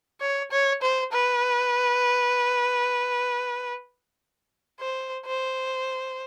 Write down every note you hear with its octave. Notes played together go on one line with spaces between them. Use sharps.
C#5
C#5
C5
B4
C5
C5